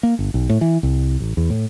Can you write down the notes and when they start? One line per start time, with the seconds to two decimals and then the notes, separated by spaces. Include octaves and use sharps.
0.03 A#3
0.19 G1
0.34 B1
0.50 A2
0.61 E3
0.83 C2
1.20 A1
1.37 E2
1.50 A2